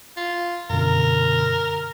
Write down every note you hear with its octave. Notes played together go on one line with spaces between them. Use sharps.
F4
F#2 B2 D3 A#4